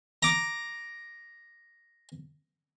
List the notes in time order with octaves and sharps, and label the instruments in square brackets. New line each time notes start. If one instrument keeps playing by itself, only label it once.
[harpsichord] A#5 D6